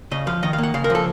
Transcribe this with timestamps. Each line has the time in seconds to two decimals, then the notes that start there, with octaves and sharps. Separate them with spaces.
0.11 C#3 D#5
0.27 F3 F5
0.43 D#3 D#5
0.53 F5
0.58 A#3
0.63 F#5
0.74 C#3 F5
0.84 A#4
0.90 F3 A4